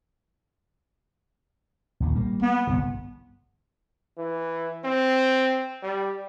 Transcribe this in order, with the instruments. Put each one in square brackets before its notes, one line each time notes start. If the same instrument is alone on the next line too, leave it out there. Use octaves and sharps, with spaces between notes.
[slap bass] A#1 D#2
G3 A#3
[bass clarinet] B3
[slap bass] G1 C2 C3
[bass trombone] E3
C4
G3